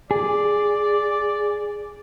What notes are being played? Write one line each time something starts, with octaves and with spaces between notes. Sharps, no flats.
G#4 D5